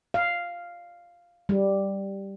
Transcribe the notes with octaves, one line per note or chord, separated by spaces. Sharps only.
F5
G3